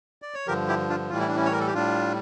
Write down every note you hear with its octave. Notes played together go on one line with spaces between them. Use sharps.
D5
C#5
G2 D3 F3 G4 A#4
E4 G4
D4 F4
A2 E3 G3 F4
E4
D4
C#4 E4
C#5
A#4
A4
G4
A2 G3 D4 F4